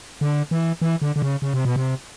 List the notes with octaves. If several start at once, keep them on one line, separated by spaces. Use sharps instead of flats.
D3
E3
E3
D3
D3
C#3
C#3
C3
B2
C3